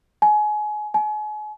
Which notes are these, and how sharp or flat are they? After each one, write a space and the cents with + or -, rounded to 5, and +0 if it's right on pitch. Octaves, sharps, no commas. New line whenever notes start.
G#5 +25
G#5 +35